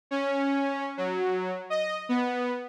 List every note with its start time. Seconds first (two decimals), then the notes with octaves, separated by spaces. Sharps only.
0.11 C#4
0.97 F#3
1.70 D#5
2.09 B3